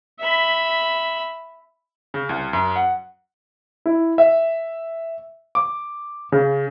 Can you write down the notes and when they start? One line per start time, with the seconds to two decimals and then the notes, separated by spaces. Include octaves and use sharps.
0.20 E5 B5
2.14 C#3
2.29 C2
2.53 F#2
2.76 F#5
3.86 E4
4.18 E5
5.55 D6
6.32 C#3